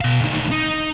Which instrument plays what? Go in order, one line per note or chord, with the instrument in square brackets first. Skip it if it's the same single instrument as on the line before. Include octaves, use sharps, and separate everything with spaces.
[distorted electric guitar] B2 F5
D2 D#3
D#4